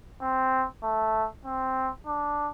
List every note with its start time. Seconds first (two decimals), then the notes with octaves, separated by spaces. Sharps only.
0.22 C4
0.83 A3
1.45 C4
2.07 D4